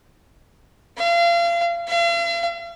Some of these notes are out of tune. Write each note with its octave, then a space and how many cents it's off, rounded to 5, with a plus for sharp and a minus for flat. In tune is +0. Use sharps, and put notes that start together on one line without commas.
F5 -35
F5 -45